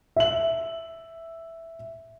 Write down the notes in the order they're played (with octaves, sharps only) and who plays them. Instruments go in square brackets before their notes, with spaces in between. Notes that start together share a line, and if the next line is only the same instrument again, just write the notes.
[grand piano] E5 F#7